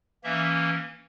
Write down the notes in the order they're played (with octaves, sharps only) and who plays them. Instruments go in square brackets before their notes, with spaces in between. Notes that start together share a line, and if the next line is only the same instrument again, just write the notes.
[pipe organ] E3 A#3 C#4 E5